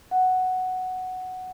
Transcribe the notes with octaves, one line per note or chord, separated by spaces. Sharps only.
F#5